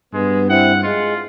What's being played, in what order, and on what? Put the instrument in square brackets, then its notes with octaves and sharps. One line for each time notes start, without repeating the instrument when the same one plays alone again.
[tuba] G2 [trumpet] G#3 [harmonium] B3
[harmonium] C4 E4 [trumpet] F#5
[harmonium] G#3 [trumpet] F4